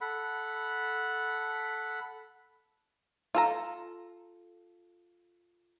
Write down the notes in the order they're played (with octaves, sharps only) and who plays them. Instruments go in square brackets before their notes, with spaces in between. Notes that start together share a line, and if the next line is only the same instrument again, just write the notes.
[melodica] A4 F#5 B5
[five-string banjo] F4 A4 A#5